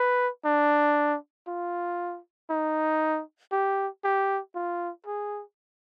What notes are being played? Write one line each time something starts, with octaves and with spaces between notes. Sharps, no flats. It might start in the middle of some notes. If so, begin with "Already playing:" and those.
Already playing: B4
D4
F4
D#4
G4
G4
F4
G#4